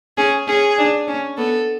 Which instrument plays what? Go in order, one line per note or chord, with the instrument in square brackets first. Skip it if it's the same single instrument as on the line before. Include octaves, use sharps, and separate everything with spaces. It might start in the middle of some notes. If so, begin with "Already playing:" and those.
[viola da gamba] C#4 [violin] G#4
[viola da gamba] C#4 [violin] G#4
[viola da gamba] D4
C#4
[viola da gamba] B3 [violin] A4